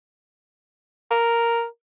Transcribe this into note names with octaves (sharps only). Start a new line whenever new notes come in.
A#4